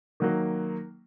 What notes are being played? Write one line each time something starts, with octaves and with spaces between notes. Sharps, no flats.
D#3 F#3 A#3